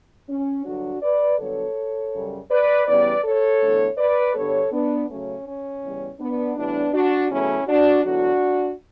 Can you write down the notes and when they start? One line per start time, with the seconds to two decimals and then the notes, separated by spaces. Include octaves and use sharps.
0.29 C#4
0.65 G2 D3 F#3 D4 F#4
1.02 B4 D5
1.39 G2 D3 F#3 B3 A4 C#5
2.13 F#2 C#3 G3
2.50 B4 D5
2.86 E2 C#3 G3 B3 B4 D5
3.23 A4 C#5
3.61 E2 D3 A3
3.98 B4 D5
4.35 G2 D3 G3 B3 A4 C#5
4.71 B3 D4
5.08 C#3 F#3 A3 C#4
5.45 C#4
5.83 E2 C#3 G3
6.19 B3 D4
6.56 A2 E3 G3 B3 D4
6.93 D4 F#4
7.30 E2 C#3 F#3 A3 C#4 E4
7.67 D4 F#4
8.04 E2 D3 F#3 D4 F#4